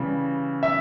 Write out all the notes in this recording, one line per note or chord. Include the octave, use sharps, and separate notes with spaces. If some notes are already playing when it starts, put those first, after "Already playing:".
Already playing: C#3 E3 G3
E5